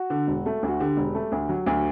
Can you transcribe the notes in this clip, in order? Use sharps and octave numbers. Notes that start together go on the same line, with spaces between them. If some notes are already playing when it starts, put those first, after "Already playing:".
Already playing: F#4
D3
E1
A3
D2 F#4
D3 G4
E1
A3
D2
F#3
D2